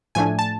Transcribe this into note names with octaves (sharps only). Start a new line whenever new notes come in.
A2 F3 A3 D4 G#5
A5